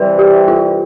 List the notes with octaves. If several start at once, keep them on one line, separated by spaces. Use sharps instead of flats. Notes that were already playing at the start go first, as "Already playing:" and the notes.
Already playing: C3 E3 G3 B4
G4
F4